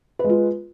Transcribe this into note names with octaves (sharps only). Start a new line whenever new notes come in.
G#3 F4 B4